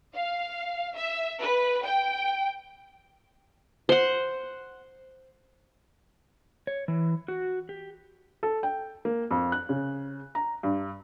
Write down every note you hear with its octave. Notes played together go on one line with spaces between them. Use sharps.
F5
E5
B4
G5
C5 F#5
C#5
E3
F#4
G4
A4
G5
A#3
F2
F#6
C#3
A#5
G2